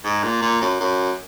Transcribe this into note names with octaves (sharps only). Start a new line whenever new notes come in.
G#2
A#2
A#2
F#2
F#2